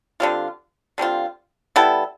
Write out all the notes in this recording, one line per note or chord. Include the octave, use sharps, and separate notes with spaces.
D3 G3 C4 F4
D3 G3 C4 F4
G3 B3 E4 A4